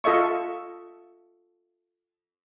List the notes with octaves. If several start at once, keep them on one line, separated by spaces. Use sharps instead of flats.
F4 A4 D#5 E5 C#6